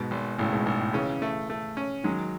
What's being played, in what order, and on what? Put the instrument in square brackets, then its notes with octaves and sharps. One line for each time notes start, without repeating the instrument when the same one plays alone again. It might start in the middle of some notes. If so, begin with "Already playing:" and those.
Already playing: [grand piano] G#2 B2
[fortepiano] G#1
[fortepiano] G#1 [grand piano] A2 C#3
[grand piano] G#2 B2
[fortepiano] G#1 [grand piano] G#2 B2
[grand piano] A2
[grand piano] C#3 E3 [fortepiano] C#4
[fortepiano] A3
A3
C#4
[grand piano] D#3 F#3 [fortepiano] G#3